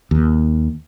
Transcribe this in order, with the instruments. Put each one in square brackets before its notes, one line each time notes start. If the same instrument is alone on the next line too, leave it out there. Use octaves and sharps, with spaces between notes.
[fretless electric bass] D#2